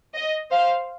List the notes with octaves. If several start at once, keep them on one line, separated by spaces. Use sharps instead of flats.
D#5
C5 F5